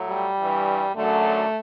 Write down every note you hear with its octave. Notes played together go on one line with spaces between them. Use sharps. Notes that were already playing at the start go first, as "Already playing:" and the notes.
Already playing: A2 F#3
G3
G2 E3
F#2 D3 F#3 A3